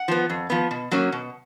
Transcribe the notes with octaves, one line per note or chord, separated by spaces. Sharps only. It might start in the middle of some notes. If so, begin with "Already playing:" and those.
Already playing: F#5
F3 B3
F2
F3 B3
B2
F#3 A#3 C#4
B2